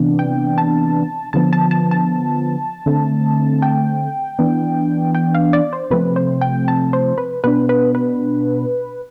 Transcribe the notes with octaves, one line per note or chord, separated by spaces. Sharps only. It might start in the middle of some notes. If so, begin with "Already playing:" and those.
Already playing: C3 E3 B3 D4
G5
A5
D3 F3 B3 A5
A5
A5
A5
D3 A3 C4
G5
E3 B3 D4
G5
F5
D5
C5
C3 F3 A3 C4 B4
C5
G5
A5
C5
B4
B2 B3 D4 B4
B4
B4